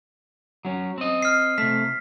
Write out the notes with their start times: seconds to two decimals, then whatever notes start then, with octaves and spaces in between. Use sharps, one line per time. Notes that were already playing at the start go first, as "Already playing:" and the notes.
0.65 F#3 C#4
0.98 C4 D#5
1.22 F6 C7
1.58 C3 A3 B6